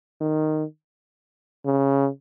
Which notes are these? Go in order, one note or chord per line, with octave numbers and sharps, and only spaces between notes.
D#3
C#3